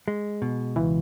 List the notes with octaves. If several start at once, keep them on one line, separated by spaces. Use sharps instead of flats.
G#3
B2
C#2 E3